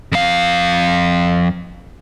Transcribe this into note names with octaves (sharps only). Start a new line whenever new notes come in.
F2 F5